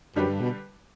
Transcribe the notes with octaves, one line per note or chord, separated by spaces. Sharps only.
F#2 D3 G3 D4 G4 B4
G2
B2